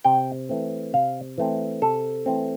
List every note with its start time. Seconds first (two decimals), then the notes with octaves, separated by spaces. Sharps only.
0.04 C3 G5
0.49 E3 A3 C4
0.93 C3 F5
1.38 E3 A3 C4
1.82 C3 A4
2.26 E3 A3 C4